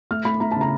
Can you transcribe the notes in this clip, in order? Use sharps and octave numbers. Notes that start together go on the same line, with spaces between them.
A3 F6
A3 B5
A3 A#5
A5
C#3 A#5